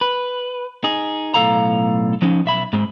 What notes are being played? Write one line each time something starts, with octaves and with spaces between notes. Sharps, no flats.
B4
D#4 G#4
B1 A2 A3 A4 F5 A#5
F3 C#4 D#4
B1 E5 B5
G#2 G#3 C4